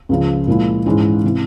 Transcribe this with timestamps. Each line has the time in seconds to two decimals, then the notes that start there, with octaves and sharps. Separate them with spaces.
0.09 C#2 C#3 F3
0.47 A#2 F3 G#3 E4
0.86 G#2 E3 G#3 C#4 E4
1.24 C3 E3